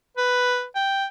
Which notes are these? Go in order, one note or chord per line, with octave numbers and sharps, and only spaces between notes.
B4
G5